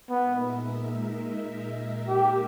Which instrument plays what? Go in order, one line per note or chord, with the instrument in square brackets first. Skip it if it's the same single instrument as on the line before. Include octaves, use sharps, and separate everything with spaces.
[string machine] A#2 G#3 D#4 A#4 E5 [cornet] B3
[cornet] G4